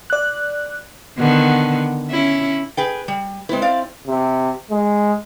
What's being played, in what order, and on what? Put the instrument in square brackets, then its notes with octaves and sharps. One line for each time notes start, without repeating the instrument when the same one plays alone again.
[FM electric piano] D5 F#6
[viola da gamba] D3 D#3 B3
C#4 E4
[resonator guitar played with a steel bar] G#4 B4 G5
G3
[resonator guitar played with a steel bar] G#3 B4 [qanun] C4 E4
[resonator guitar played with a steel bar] D5 F5
[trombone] C3
G#3